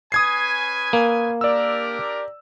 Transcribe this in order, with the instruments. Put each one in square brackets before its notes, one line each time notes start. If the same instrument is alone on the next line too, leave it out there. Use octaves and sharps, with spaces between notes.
[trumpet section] C#4 B4 G#5 [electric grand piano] D#6 G#6 C7
[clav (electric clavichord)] A#3
[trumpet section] D4 G4 A#4 [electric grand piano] D5 E6